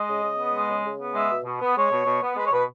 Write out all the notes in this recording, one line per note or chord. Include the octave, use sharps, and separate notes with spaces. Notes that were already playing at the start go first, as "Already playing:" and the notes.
Already playing: G#3 D#5
C#3
C#3
B3
G#3
C#3
C#3
B3
G#3 E5
B2
B2
B3
G#3 C#5
B2
B2
B3
G#3 B4
C#5
B2 B4